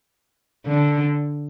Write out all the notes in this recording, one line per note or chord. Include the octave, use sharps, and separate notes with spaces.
D3